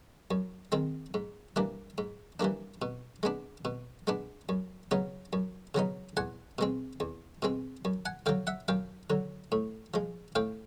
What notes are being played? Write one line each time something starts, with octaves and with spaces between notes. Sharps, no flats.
F#2
D#3 G#3 C4
G#2
E3 G3 A#3 D4
G#2
E3 G3 A#3 D4
B2
G#3 B3 D4
B2
G#3 B3 D4
F#2
C#3 F#3 B3 D#4
F#2
C#3 F#3 B3 D#4
E2 F#5 G#5
B2 G#3 C4
E2
B2 G#3 C4
F#2
F#5 G#5
D3 F#3 F5 G5
E5 F#5
F#2 F5 G5
D3 F#3
A2
F3 G#3
A2 F5 G5